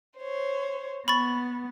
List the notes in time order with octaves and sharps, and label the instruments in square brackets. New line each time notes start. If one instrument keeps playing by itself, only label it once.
[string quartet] C5 C#5
[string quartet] B3 [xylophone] B5 C#6 A6